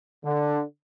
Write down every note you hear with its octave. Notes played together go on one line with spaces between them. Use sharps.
D3